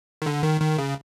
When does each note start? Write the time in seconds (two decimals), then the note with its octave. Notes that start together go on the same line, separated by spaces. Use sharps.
0.22 D#3
0.26 D3
0.43 D#3
0.61 D#3
0.78 C#3